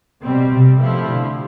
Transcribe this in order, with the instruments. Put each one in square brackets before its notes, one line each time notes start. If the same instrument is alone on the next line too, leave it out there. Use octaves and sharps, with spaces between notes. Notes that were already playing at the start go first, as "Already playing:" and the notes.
[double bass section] B2 [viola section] G3 C4 G4
[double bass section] C3
[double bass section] B2 [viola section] F3 A3 E4 G4
[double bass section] D3